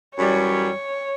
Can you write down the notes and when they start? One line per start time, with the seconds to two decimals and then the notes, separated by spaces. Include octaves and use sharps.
0.17 F#2 E3 G3 C#5